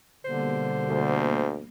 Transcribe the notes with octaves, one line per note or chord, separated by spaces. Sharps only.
B2 D3 G3 A#3 C5
D2